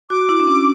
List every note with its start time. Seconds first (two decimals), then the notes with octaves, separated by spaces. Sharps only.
0.10 F#4 D6
0.29 E4
0.40 D4
0.47 C#4